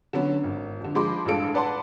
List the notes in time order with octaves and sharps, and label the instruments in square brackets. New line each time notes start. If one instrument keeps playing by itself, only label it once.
[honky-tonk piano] D3 F#3 B3 C#4
G#1
F2 D3
F3 G#3 B5 C6 D6
A1 G2 G#3 F4 A4 D7
B4 D5 F#5 A5 C6